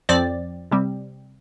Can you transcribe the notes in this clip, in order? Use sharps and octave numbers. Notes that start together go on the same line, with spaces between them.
F2 F3 C4 D5
C3 G3 C4